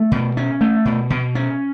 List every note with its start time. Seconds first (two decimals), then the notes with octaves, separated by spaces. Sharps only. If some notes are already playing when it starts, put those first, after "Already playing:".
Already playing: A3
0.12 B2
0.37 C#4
0.61 A3
0.85 B2
1.10 B2
1.35 C#4